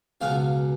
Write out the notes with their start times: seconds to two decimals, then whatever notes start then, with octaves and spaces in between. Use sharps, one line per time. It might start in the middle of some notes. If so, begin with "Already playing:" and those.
0.21 C#2 B2 F#3 C#4 F4 F5